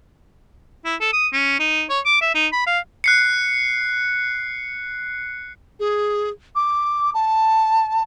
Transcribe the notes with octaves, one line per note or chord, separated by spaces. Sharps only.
E4
A4
D#6
C#4
D#4
C#5
D6
E5
D#4
B5
F5
F#6 C7 C#7
G#4
D6
A5